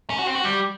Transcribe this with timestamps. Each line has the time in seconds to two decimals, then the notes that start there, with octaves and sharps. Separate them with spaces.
0.10 C#4
0.18 F#4
0.27 C4
0.35 F#4
0.44 G3